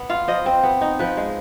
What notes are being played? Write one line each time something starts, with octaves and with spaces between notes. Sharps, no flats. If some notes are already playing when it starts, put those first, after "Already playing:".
Already playing: B3
F4 F5
F3 D#5
C4
B3
D#4
F3 B4
G#3